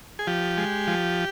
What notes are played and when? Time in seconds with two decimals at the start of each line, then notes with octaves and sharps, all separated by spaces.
0.19 G#4
0.27 F3 G4
0.57 G#3
0.87 F3